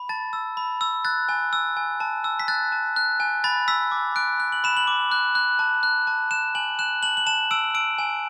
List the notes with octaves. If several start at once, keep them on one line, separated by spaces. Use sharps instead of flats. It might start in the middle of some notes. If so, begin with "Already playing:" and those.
Already playing: B5
A5 A6
E6
B5
E6
F#6 A6
G#5
E6
G#5
A5
E6
B6
F#6 A6
A5
F#6
G#5
B5 A6
E6 B6
D6
F#6 D7
F#6
F#7
B5 E7
F#7
D6
F#6
F#6
A5
F#6
A5
F#6 E7
G#5 F#7
F#6 E7
A5 F#7
F#7
A5 E7
E6 D7
E6 D7
G#5